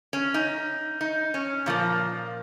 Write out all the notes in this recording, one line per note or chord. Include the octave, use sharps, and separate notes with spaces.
C#4
D#4
D#4
C#4
A#2 F3 A#3